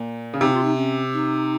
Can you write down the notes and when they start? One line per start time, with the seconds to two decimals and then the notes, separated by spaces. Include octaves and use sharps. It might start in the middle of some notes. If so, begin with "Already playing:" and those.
Already playing: A#2
0.34 C#3
0.41 C3 D#4
0.52 F4
0.64 D#4
0.77 C#4
1.13 D#4